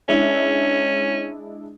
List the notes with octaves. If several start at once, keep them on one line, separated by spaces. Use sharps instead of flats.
G#3 C#4 D4 E4